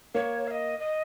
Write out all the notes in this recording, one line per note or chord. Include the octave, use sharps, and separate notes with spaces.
A#3 C#5
F5
D#5
D#5